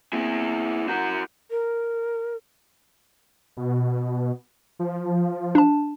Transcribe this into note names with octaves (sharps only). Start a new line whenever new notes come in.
A#3 C4 E4 G#4
E4 F#4 A#4 F#5 G6
A#4
B2
F3
D4 A5